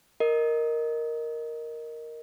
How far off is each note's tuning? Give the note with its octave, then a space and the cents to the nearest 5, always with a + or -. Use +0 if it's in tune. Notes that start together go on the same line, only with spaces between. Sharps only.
A#4 +0 D#5 +0